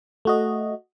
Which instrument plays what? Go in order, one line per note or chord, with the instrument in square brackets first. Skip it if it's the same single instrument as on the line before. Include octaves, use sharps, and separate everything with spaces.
[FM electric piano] A3 F#4 D#5